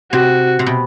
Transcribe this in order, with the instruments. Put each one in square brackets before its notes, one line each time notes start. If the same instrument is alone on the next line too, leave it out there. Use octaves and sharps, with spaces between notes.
[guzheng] C3 [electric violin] F#4
[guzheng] C3
B2